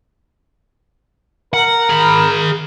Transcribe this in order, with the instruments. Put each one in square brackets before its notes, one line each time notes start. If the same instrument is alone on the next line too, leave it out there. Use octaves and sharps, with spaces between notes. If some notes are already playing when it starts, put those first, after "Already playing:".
[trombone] A#4 [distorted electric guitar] F#5
[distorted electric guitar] G#4 B5